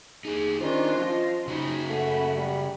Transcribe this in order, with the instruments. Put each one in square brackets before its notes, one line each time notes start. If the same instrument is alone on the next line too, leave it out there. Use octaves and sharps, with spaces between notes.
[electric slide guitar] D#4 G4 [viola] G#4
[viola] D#3 C#4 [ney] D4 [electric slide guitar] F4 [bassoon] C5
[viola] F3 [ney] D#5
[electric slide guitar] C#3 F#4 C#5 [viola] C#4 B5 [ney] D#4
[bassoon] A3 [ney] F#5
[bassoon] G3